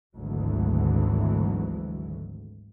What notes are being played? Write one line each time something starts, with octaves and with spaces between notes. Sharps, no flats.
G#1 D2 E3 F#3 G#3